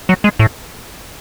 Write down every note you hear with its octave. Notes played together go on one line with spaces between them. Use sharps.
F#3
G#3
A2